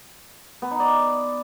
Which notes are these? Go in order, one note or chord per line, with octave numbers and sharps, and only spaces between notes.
B3
D#4
D5